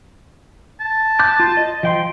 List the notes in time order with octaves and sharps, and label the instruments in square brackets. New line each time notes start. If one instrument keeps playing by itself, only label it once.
[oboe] A5
[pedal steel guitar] D6 F#6 G6
F4
D#5
F3 G5 C6